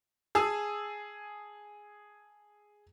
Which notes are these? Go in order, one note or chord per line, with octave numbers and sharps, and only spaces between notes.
G#4 G#5 A5 D#6 E6